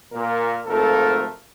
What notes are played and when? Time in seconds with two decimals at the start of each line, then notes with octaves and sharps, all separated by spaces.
0.12 A#2 A#4
0.67 G#1 F3 A3 F4 A4 A#4